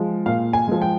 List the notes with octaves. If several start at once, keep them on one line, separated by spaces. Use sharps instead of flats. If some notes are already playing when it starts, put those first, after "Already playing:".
Already playing: F3 G#3
A#2 F5
G#5
F3 G#3
G5